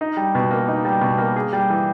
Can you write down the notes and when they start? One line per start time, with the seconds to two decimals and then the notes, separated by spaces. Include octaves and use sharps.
0.01 D#4
0.17 G3
0.35 B2
0.51 A#3
0.68 D#4
0.85 G3
1.01 B2
1.18 A#3
1.36 G#4
1.53 G3
1.70 E3